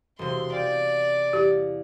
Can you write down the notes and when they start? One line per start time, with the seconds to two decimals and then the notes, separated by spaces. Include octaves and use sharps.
0.19 E1 C3 C6
0.52 D5 F5 G5
1.33 E2 G4